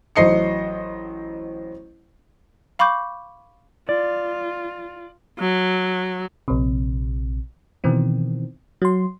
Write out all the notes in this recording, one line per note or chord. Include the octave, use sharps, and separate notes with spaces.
A1 F#3 C5 D#5 C7 C#7
F5 B5 C#6 D6 G6
F4 D5
F#3
A#1 C3
B2 D#3 E3 C4
F#3 C6